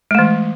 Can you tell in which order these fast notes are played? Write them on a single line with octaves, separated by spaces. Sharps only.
G#3 A3 E3